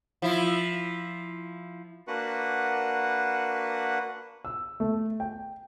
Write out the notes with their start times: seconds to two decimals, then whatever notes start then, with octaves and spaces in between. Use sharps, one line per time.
0.22 F3 E4
2.08 A#3 D4 F#4 B4 F#5
4.45 E6
4.80 A3
5.20 G5